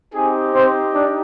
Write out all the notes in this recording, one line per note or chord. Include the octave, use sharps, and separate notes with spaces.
C4 D#4 G4 G#4
C4 C5
D4 D5